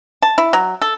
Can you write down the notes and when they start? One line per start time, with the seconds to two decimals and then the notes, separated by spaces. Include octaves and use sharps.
0.22 A5
0.38 E4
0.53 F#3
0.82 A4